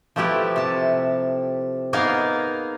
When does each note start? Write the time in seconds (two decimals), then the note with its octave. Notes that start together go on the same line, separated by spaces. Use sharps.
0.16 F3 A3 E4 G4 B4
0.56 C3 A5
1.93 A#3 B3 D#4 G#4 A#4 F5